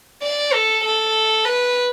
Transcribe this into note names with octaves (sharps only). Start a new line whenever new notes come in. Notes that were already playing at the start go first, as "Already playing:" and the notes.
D5
A4
A4
B4